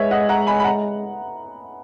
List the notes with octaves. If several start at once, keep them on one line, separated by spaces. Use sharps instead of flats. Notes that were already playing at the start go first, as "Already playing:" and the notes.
Already playing: G#3 B4 C#5 E5
D#5 F#5
F#5 A#5
G#5 B5
B5
F#5 A#5